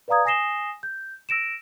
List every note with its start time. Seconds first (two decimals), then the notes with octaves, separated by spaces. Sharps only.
0.08 B4 D5 F5 A#5 D#6 G#6
0.25 G#5 D#6 A#6 C7 E7 G7
0.83 G6
1.29 E6 A#6 D7 E7